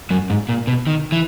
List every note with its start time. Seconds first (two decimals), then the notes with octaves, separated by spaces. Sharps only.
0.10 F#2 F#3
0.30 G#2
0.49 A#2
0.67 B2
0.87 D#3
1.12 E3